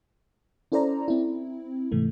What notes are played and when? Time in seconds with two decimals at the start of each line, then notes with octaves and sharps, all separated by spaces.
0.72 C#4 E4 A4 C5 D5 A#5
1.08 C4 E4
1.92 G#2 C3 E3 A3